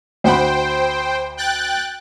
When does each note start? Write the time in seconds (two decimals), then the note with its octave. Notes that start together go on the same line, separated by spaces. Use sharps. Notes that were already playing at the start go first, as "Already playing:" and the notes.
0.24 D2 C5 F#5 G5 B5
1.37 G5 F#6 A6